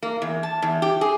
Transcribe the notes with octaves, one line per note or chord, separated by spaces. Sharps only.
A#3
E2
A5
E2
G4
G#4